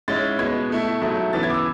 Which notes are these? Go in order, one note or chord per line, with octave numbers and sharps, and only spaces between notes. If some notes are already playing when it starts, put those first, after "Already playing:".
G#2 G#3 C#4 E4 A6
B2 G#3 B3 G#6
B2 A3 E4
G#2 F#3 A3 E4
C#3 E3 B3 E4 A6
G#6
D6
E6